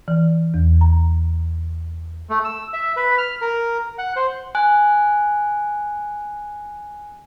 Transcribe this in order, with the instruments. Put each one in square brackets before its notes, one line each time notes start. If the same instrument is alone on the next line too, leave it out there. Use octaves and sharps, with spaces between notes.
[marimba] E3
E2
A#5
[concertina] A3
E6
E5
B4
F6
A#4
F#5
C5
[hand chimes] G#5 F#6